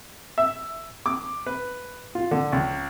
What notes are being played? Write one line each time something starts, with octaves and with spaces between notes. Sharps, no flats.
E5
D6
B4
F4
D3
C#2